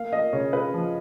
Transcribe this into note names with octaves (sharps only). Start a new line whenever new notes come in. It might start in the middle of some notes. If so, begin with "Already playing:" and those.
Already playing: A#3 F5
A#3 D#5
C#3 C#5
C#3 B4
F3